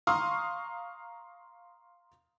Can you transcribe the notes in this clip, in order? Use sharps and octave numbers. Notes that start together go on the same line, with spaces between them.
F5 A#5 C6 C#6 D#6 F6